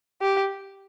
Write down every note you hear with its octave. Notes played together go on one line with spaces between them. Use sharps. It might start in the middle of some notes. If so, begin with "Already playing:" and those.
G4